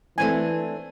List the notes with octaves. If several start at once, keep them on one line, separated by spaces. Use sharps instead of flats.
E3 A3 C4 D4 G#5